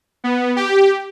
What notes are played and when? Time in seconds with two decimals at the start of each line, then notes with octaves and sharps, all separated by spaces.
0.24 B3
0.56 G4